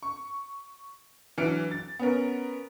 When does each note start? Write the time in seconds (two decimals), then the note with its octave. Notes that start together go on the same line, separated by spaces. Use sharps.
0.03 C#6
1.38 E3 F#3 D4 F6 C#7 D7
1.71 A6
1.99 B3 C#4 A#4